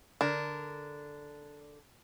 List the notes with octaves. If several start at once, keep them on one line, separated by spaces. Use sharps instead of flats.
D3 D4 A#4